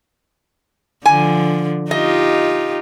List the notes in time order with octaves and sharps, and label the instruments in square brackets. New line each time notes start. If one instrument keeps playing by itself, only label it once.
[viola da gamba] D3 F3 [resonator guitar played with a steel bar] G#5
[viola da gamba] D#4 F4 G4 [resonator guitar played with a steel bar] D#5